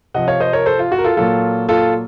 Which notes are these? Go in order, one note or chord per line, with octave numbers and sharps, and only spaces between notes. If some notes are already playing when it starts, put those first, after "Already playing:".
C3 F3 C4 D#5 F#5
C#5 F5
C5 D#5
A#4 C#5
A4 C5
F4
F#4
A#4
F4 A4
A#2 F#3 A#3 F4 A4
F4 A4